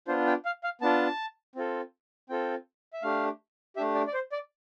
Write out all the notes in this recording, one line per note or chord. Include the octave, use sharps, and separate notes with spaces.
B3 D4 F4 C5
G5
F5
F5
B3 D4 F4 A5
C4 F4 A4
C4 F4 A4 G5
E5
A3 D4 G4 F5
A3 D4 G4 E5
D5
D5
C5
D5